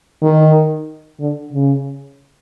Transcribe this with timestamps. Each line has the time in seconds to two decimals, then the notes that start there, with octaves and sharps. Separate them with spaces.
0.22 D#3
1.19 D3
1.53 C#3